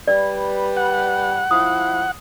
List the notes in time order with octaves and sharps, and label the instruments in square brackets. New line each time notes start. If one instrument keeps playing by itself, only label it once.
[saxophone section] G3 B4 [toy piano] D5
[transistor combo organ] F#5
[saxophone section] F3 E4 [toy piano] D#6